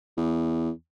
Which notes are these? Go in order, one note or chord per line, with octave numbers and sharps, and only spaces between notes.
E2